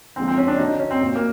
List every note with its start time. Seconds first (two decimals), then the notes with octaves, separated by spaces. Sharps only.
0.16 D3 F3 G#3 C4
0.28 C4
0.38 C#4
0.48 D4
0.58 D3 F#3 D#4
0.69 D#4
0.79 C#4
0.91 C4
1.01 A#2 F#3
1.16 A#3